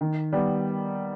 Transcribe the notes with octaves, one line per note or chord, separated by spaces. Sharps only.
D#3
G3 B3